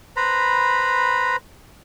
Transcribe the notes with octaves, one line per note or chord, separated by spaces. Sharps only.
B4 C5 A#5 B5